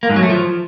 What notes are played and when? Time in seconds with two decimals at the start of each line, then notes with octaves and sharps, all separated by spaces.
0.03 A#3
0.10 G#2
0.16 F#3
0.23 A3
0.29 F3